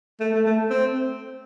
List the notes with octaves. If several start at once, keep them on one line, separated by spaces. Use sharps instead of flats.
A3
A3
A3
C4